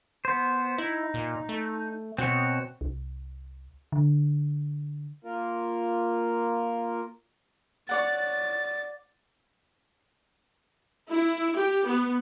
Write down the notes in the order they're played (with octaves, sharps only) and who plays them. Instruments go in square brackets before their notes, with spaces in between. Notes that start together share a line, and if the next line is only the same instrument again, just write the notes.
[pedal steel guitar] B3 C5
[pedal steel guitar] D#4 [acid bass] E4
[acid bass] A#2
A3
[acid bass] B2 [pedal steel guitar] C4 F#4 C#5
[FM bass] C2
D3
[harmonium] A#3 F4 A#4
[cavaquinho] C#5 D5 F#5 [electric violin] A6
[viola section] E4
G4
B3